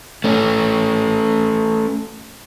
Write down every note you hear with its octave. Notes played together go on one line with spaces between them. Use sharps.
A3 C#4